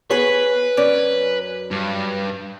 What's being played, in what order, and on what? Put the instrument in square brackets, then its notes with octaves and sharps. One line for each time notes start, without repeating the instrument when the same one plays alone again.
[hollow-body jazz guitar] B3 G#4 C#5 [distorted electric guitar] B4
[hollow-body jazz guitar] F#2 C#4 D5
[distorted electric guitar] G2